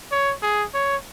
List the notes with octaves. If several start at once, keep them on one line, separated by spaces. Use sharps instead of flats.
C#5
G#4
C#5